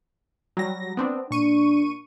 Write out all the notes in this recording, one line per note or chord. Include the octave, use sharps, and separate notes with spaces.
F#3 G3 A#6
B3 C4 D4
A#2 D4 C#6 D#7